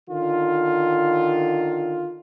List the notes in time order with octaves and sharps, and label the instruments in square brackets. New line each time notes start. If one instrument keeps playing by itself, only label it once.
[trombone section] D3 D#3 F4